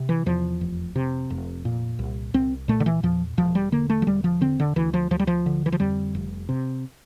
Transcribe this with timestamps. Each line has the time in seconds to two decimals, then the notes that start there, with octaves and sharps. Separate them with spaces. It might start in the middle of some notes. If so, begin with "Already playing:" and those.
Already playing: C3
0.09 E3
0.26 E2 F3
0.61 F1
0.96 C3
1.30 F1
1.65 A#2
1.99 C2
2.34 C2 C4
2.68 A#2 A3
2.80 D3
2.86 E3
3.03 E2 F3
3.37 E1 F3
3.55 G3
3.72 D3 A#3
3.90 A3
4.02 F3
4.07 E1 G3
4.24 F3
4.41 D3 C4
4.60 D3
4.76 D2 E3
4.94 F3
5.11 D2 F3
5.19 G3
5.27 F3
5.46 D3
5.66 E3
5.72 F3
5.80 F2 G3
6.15 F1
6.49 C3